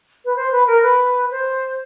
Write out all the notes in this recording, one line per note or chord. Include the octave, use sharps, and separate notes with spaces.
B4
C5
B4
A#4
B4
C5